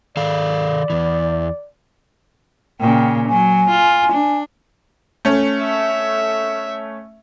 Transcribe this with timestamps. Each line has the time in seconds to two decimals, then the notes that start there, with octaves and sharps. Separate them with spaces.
0.17 D#3 A4 D5 F5
0.90 E2 E3
2.80 A#2 C#3 G5
3.30 F#3 G#5
3.70 F4
4.13 D4
5.25 A3 C#4
5.62 E5